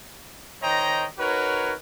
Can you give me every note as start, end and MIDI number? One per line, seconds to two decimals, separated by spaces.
0.62 1.06 51
0.62 1.06 72
0.62 1.06 73
0.62 1.06 75
0.62 1.06 79
0.62 1.06 82
1.18 1.73 63
1.18 1.73 66
1.18 1.73 70
1.18 1.73 71
1.18 1.73 73